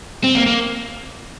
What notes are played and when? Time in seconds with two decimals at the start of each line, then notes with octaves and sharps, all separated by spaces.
0.24 C4
0.35 A#3
0.46 A#3